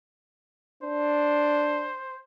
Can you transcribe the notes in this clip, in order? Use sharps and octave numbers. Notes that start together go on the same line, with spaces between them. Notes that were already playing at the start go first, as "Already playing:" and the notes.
D4 C5